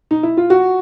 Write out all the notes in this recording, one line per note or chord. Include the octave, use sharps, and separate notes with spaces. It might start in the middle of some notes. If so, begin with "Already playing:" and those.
D#4
E4
F4
F#4